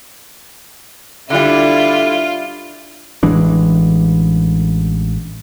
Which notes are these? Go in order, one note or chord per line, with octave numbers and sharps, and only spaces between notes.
D3 G3 D4 E4 F4
A1 E3 G#3 D4